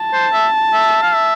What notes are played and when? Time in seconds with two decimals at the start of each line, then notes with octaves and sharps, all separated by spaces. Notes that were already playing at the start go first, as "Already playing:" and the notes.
Already playing: A5
0.13 C5
0.33 E5
0.74 E5
1.03 F5
1.14 E5